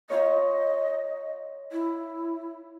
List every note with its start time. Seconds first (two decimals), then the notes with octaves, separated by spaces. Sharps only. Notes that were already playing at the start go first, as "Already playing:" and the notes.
0.10 F4 C#5 D#5
1.72 E4